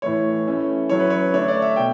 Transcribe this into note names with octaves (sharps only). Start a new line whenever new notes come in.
A2 E3 A3 C#5
E3 A3 C#4 E4
F#3 C#4 E4 C#5
B4
C#5
D3 A3 D4 C#5
D5
E5
B2 G5